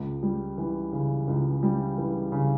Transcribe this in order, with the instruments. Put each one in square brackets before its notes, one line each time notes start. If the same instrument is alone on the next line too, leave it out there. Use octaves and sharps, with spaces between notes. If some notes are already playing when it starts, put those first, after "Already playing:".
Already playing: [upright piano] C#2
G3
E3
C#3
C#2
G3
E3
C#3